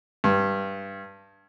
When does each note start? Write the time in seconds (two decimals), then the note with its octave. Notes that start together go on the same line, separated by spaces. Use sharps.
0.24 G2